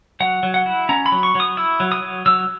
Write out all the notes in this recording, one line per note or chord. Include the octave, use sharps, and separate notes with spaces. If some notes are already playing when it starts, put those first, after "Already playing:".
F#3 F#5
F#3
F#5
E4
C#4 A#5
B5
F#3
C#6
F#3 D#6
E4 E6
F#3
D#6
F#3
F#3 E6